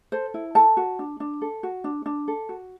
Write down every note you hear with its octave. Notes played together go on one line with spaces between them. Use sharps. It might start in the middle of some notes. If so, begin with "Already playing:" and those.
A4 C5
E4
A4 A5
F#4
D4
D4
A4
F#4
D4
D4
A4
F#4